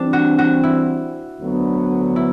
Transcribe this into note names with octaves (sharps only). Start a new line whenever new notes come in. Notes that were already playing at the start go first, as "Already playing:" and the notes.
Already playing: E3 G3 C4 D4
F#4
F#4
E4
D2 D3 F#3 B3
E4